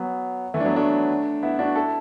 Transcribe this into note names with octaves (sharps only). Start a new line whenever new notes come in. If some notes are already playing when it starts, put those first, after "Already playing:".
Already playing: F#3 B3
E3 A3
D4
F#3 B3
A3 D4
B3 E4
D4 F#4
E4 A4